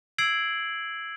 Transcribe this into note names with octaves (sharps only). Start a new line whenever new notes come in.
E6 G#6 C7 D7 F#7